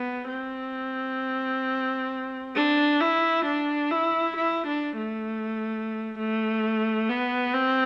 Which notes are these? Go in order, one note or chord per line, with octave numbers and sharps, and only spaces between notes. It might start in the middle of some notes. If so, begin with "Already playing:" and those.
Already playing: B3
C4
D4
E4
D4
E4
E4
D4
A3
A3
B3
C4